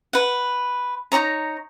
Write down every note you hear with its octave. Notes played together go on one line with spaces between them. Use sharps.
B4 F#5
D#4 F#4 C#5 A#5